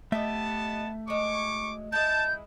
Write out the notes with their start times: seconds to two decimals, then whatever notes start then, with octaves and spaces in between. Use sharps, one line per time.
0.12 A3 B3 G4 D#5 E5 A5
1.08 F#3 G#3 C#6 D6
1.92 G#3 E4 A5 G6